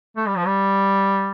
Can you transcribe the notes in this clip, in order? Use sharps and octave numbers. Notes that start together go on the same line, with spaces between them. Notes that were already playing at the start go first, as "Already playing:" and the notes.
A3
G3
F3
G3